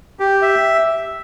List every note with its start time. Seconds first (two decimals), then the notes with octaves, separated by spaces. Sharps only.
0.20 G4
0.42 E5